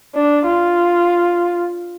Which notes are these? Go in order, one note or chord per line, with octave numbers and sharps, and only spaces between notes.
D4
F4